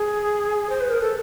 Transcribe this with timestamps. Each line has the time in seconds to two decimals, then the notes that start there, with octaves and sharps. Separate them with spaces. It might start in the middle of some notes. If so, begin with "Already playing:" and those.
Already playing: G#4
0.70 C5
0.81 B4
0.90 A#4
1.01 A4